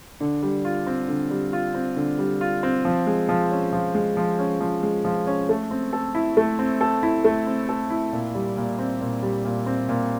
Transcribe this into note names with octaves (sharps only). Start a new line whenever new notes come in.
D3
G3
F4
C4
D3
G3
F4
C4
D3
G3
F4
C4
F3
G#3
F3
C#4
F3
G#3
F3
C#4
F3
G#3
F3
C#4
A3
C4
A4
E4
A3
C4
A4
E4
A3
C4
A4
E4
A#2
G3
A#2
C4
A#2
G3
A#2
C4
A#2